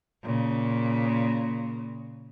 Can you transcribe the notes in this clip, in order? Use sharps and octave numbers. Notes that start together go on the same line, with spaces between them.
A#2 C#3